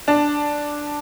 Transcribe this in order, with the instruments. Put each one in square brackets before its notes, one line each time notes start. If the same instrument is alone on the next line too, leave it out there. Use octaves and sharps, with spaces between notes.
[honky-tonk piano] D4